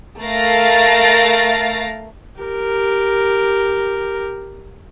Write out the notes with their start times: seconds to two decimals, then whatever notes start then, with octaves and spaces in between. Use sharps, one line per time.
0.21 A3 A#4 F5 A6 A#6
2.41 G4 A#4